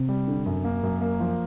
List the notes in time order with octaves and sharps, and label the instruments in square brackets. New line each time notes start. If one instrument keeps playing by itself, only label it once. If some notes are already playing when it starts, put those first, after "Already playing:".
Already playing: [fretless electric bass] C3
[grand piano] G3
D3
F#2
A#3
F#2
A#3
F3